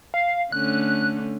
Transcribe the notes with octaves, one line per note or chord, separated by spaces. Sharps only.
F5
D3 A3 C#4 F#6